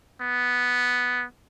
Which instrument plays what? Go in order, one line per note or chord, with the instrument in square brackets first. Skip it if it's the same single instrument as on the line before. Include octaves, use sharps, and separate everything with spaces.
[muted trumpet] B3